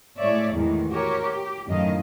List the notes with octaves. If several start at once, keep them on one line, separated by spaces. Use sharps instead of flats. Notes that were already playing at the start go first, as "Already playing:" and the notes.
A2 G#3 C#5 D5 E5
E2 A2 D#3 E3 G#3
F#4 G4 A#4 C#5
G4
F#2 A2 D#3 D#5 F5